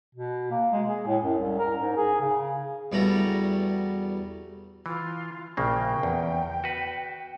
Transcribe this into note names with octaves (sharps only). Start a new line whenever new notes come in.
B2
A#3
G#3
G#4
A2
F#2
C2
A#4
G#2
G#4
C#3
E2 G3 A3 F#4 A#5
E3 F4
A#1 C#3 A#3 G5
E2
F#4 B4